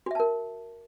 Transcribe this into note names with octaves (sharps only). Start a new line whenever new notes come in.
F#4 A#4 E5 A5